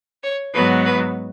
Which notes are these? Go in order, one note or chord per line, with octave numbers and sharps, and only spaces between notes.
C#5
G#2 F#3 B3 B4
B4